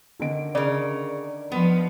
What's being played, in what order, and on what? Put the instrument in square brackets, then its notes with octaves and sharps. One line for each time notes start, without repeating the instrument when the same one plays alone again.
[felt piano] D3 D#3 D7
[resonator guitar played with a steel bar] C#3 A#4 [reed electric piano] D5
[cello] F3 [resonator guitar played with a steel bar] B3